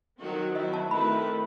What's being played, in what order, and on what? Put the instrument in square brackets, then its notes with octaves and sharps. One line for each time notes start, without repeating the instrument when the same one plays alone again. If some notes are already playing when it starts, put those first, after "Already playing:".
[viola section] D#3 F#3 C4 F#4
[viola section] F#3 C4 E4 [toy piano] D#5
[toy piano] A5
[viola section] D#3 A3 C4 E4 B4 [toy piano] B5